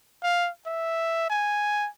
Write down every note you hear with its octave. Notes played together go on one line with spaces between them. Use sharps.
F5
E5
G#5